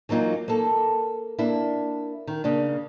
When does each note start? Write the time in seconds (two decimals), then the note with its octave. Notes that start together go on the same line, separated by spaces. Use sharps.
0.09 E3 F#3 A#3 D#4 F4
0.48 A#3 A4
1.39 A#3 D4 E4
2.27 D#3
2.44 C#3 A#3 D4